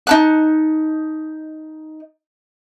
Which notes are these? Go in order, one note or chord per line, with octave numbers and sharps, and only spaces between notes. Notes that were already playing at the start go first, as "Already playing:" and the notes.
D#4 A5 F#6